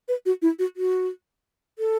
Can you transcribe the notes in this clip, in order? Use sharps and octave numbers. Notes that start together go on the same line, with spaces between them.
B4
F#4
E4
F#4
F#4
A4